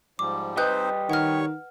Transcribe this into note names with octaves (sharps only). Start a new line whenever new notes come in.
G#2 F3 G3 D6
G3 C4 D#4 B4 C5 D#5 F#6 G6
D#3 C#5 F#5 C#6 F6